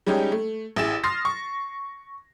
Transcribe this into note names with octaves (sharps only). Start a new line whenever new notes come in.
G3 G#3 C#4 D#4 G4
A3
A1 E4 G#4 A6 E7
C6 D#6 F6 A6 A#6 C7
C#6